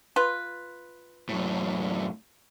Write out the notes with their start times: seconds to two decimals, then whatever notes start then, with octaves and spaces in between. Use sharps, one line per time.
0.16 F4 B4
1.29 F#2 A2